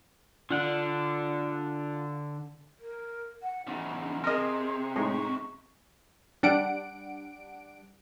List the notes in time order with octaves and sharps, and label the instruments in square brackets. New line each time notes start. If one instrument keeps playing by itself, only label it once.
[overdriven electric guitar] D3 D4 [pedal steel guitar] F4 F#5
[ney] A#4
F#5
[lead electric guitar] E2 C#3 [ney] D#4
[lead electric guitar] C3 [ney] G#4 [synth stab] A#4 D#5
[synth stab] A2 G#3 D#4 [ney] C#6
[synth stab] G3 D4 F#5 D7